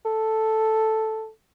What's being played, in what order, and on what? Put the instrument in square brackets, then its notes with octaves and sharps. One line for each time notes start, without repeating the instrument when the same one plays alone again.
[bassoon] A4